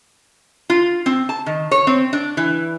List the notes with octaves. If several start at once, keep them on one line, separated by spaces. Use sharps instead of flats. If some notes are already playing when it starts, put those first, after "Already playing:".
F4
C4
A5
D#3
C#5
C4
D4
E3